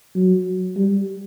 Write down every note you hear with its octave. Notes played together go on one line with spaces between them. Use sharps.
F#3
G3